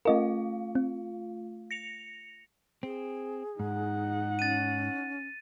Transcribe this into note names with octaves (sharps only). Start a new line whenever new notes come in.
A3 F4 A#4 D#5 F5
C4
A#6 C#7 F7
C4 G#4
G#2 D#4 F#5
C#4 A6 D#7